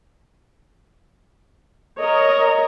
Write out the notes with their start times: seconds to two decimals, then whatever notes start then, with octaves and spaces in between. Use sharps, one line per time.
1.99 A#4 C#5 D#5